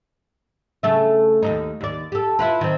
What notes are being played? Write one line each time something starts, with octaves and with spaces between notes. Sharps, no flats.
C#3 A3 E5
D#2 G#2 D#4
D#2 D5
G4 A4
E4 F4 B4
D#3 C4